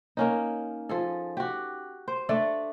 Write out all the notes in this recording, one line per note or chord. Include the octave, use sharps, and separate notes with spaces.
A#3 C#4 D#4
F3 G#4 A4
F#4 G4
C5
A3 D4 A4 D5